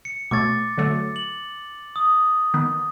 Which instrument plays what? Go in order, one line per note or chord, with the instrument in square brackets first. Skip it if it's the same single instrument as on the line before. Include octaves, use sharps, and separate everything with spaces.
[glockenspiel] C#7
[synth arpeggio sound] B2 A3 C#5 [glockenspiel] D6 A6
[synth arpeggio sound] D3 F#3 A3
[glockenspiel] F#7
D#6
[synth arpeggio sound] D#3 B3